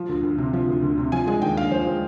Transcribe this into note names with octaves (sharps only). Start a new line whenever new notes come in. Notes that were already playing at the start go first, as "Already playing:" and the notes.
Already playing: F3
D2
D2
C3
F3
D2
D2
C3
F3 G#5
G#3 G#5
D#2 G5
D3 F5
F3 C5
G#3